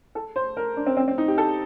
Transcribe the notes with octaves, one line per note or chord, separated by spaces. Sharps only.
A4
C5
A#4
D4
C4
C4
C4
D#4
G4
A4